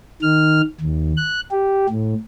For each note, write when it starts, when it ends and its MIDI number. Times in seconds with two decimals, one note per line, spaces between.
0.22 0.61 51
0.22 0.61 89
0.81 1.13 39
1.17 1.40 90
1.51 1.87 67
1.89 2.14 45